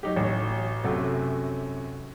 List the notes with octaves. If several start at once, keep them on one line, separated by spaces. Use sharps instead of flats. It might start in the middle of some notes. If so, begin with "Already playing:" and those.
F#3 D#4 G4
A1 F#3
F#2 C3 A3 F#4